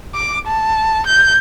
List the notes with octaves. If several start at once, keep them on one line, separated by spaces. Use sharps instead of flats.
D6
A5
G6